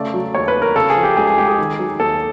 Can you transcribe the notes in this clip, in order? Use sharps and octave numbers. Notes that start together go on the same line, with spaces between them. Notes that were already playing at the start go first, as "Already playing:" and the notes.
Already playing: C#3 A3 D5
F#3
D#2 C#5
B4
D#2
A#4
C#3 A4
G#4
F3
G4
C#2 G#4
G#4
G#3 G4
G#4
D#3
F#3
D#2 A4